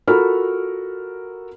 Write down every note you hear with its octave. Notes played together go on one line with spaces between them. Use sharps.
F4 F#4 A4 A#4 B5 F6